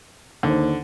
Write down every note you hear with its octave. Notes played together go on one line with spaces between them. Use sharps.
D#2 D3 D#3 C5